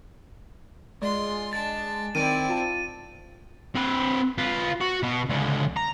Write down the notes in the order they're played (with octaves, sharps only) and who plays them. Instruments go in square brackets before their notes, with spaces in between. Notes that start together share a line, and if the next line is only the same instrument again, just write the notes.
[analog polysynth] G#3 [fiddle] F4 C6 [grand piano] D5
[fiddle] D4 A5 [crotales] A6
[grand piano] D#3 D7 [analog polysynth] C4 [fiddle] E4 D5 [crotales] D#7
[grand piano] F4 A5
[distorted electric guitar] C4 B4
F4 B4
F#4
B2
C#2 D3
A#5